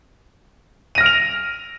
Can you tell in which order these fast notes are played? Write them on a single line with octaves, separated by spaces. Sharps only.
D#7 A#6 F6 D7 F7